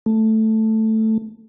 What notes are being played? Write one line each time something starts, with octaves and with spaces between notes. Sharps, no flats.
A3